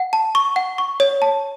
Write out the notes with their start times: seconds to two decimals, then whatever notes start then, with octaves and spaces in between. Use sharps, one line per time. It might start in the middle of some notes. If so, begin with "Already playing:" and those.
Already playing: F#5
0.13 A5
0.35 C#6
0.56 F#5
0.78 C#6
1.00 C#5
1.22 A5